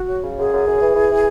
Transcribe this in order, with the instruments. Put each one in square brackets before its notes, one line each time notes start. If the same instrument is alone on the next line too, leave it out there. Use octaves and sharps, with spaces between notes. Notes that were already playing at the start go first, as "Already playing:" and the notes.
Already playing: [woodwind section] F#4
F#3
C#3
F#2 G#4
F#2
F#2
E3
E3
E3